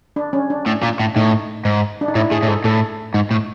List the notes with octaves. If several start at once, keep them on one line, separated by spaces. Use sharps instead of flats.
D4
C#4
D4
A2
A#2
A2
A2 D#4
G#2
D4
D#4
A2 E4
A2 G#4
A2
G#2 A4
A2 A4
G#2
A2